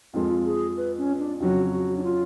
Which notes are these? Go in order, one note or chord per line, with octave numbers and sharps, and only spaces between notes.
F2 F3 G#3 F4
G#4
B4
C#4
D4
F2 C#3 F#3 C#4 F#4
F#4
D4
F4